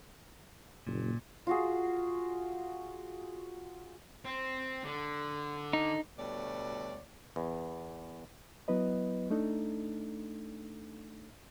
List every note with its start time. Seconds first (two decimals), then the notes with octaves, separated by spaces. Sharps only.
0.87 F#1 A#2
1.47 F4 F#4 G#4
4.25 C4
4.85 D3
5.73 D#4
6.17 D2 B2 G3 C#5 D5
7.36 E2
8.68 F#3 B3 E4 B4 D#5
9.30 A3 D4 D#4 A4